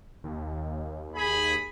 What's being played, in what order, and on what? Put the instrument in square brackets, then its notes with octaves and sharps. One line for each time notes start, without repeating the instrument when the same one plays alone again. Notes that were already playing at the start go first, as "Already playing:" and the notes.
[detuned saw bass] D#2
[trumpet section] G#4 B5